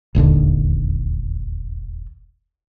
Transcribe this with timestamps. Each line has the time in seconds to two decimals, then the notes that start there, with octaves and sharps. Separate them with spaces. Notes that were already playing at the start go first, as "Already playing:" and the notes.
0.15 E1 A#1 D#2 D3